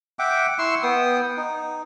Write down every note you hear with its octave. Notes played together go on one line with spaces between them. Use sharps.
E5 F#5 G5 D6
E4 C6 C#6 E6
B3 G5 D#6
D#4